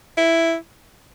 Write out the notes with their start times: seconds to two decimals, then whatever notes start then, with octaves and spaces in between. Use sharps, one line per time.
0.17 E4